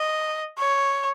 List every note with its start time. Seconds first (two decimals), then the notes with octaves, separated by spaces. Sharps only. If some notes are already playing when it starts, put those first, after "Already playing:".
Already playing: D#5
0.59 C#5